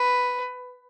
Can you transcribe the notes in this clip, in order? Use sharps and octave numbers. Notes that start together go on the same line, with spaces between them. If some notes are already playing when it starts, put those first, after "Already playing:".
Already playing: B4